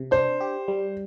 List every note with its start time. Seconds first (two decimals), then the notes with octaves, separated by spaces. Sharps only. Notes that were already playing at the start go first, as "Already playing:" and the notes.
Already playing: C3
0.11 D4 C5
0.41 G4
0.68 G3